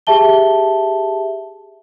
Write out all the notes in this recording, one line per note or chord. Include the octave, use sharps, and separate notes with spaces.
G4 G#4 E5 A5 G7